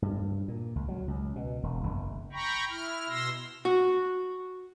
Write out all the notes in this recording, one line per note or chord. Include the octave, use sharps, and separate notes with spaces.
G2
A#2
C#2
F#3
C#2
B2
E1
F#1
G5 A#5 B5 C#6
E4 F6
B2 C6 E6 A#6
F#4